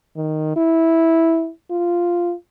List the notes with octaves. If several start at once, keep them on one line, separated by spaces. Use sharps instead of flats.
D#3
E4
F4